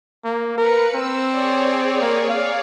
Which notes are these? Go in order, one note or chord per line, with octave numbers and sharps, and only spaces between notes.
A#3
A#4 B4 C#7
C4 E6
G#4 C#5 D5
A#3
F5